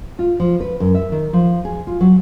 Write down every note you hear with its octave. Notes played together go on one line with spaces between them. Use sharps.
F4
F3
B4
F#2
E5
D#3
F3
G#4
F4
F#3